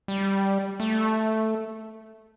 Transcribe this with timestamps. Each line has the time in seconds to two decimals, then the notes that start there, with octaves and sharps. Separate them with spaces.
0.08 G3
0.80 A3